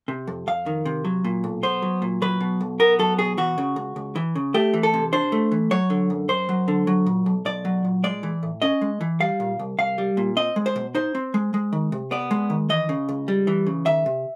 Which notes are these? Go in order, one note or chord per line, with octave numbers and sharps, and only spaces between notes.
C3
F2
F2 F5
D#3
C3
F#3
A#2
B1
B3 C5
F#3
A#2
F#3 B4
B2
B1
B3 A#4
F#3 A4
B2 G#4
E3 F#4
C#3
C#2
C#2
E3
C#3
A3 G4
E3
A4
C3
D4 C5
A3
E3
F#3 C#5
D3
F#2
F#2 C5
F#3
D3
F#3
A#2
B1
B1 D5
F#3
A#2
G#3 D5
E3
A2
C#4 D#5
G#3
E3
G3 F5
A#2
C2
C2 F5
G3
A#2
C4 D#5
G#3
C5
B2
D#4 C5
C4
G#3
G#3
D#3
C3
B3 D5
G#3
D#3
E3 D#5
C#3
C#2
G3
E3
C#3
D#3 E5
C3